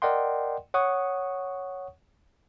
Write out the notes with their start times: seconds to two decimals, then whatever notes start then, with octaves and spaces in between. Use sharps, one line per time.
0.02 A#4 D5 D#5 F#5 G5 C6
0.74 C#5 F#5 C#6 D#6